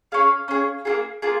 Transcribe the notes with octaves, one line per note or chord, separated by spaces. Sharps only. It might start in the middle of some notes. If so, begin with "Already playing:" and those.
C#4 G#4 F5
C#4 G#4
A#3 F4 G#4
A#3 F4 G#4